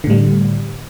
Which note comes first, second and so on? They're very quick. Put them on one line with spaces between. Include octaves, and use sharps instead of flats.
D3 A2 G3